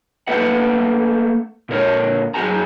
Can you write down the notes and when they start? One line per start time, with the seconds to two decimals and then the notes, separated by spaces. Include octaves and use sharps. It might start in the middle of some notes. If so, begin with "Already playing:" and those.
0.27 A3 A#3 A4 B4 E5 F#5
1.69 A#2 D3 A#4 C#5
2.34 F#2 B2 F#4 G#4 G#5 A#5